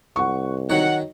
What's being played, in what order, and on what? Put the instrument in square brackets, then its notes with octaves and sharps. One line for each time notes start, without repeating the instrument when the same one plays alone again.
[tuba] C2 [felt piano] F#5 C#6
[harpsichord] D#3 F#3 C#5 [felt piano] D#4 [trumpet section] F#5